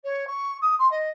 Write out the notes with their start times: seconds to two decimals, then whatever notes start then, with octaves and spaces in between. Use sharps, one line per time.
0.04 C#5
0.27 C#6
0.61 D#6
0.79 C6
0.91 D#5